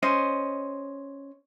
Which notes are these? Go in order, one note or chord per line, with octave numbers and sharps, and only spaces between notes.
C#4 C5 D#5